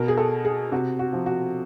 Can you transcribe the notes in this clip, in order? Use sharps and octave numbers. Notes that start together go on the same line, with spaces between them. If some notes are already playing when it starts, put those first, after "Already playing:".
Already playing: B2 A#4
G#4
A4
G#4
C3 F#4
F#4
F3
F#4